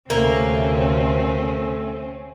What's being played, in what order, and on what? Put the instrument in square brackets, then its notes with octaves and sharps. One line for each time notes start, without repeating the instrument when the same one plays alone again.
[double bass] D2 C3 [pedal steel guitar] A3 [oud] A#3 [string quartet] C4 C#4